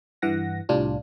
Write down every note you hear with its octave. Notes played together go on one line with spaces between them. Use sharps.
G2 E3 F#5 A#6
C2 A2 G3 D4 F4